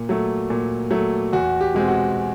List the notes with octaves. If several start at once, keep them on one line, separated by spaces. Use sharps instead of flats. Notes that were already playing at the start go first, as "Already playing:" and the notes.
Already playing: A#2
F#3 A3
A#2
F#3 A3
E2 F#4
G4
B2 G#3 C4
F#4